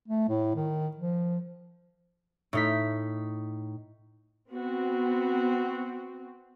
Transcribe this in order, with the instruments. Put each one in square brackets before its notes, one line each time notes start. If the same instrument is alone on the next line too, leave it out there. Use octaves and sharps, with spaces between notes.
[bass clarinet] A3
A2
D#3
F3
[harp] A2 D#4 B6
[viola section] B3 C4 F#4